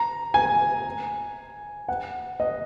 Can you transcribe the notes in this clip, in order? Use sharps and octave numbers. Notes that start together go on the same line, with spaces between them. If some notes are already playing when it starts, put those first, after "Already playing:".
Already playing: A#5
G#5
F#5
D#5